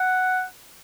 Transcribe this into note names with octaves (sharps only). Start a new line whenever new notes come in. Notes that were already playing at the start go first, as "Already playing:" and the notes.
Already playing: F#5